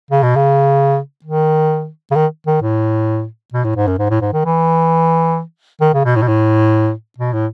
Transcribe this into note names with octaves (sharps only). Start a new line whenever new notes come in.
C#3
B2
C#3
D#3
C#3
D#3
D#3
A2
B2
A2
G#2
F#2
G#2
A2
G#2
D#3
E3
D#3
C#3
B2
A2
B2
A2
B2
A2